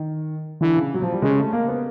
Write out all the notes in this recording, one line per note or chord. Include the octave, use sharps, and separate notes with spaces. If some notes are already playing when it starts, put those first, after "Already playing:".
Already playing: D#3
D3 E3
C#3
F#3
F3
G3
C#3 G#3
A3
A#3
B3